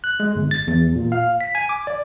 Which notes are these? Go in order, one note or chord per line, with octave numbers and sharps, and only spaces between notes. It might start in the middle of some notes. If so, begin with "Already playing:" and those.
F#6
G#3
G1
A6
E2
A#2
F5
B6
G#5
D6
D5